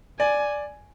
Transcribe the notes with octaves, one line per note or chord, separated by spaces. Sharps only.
D5 G#5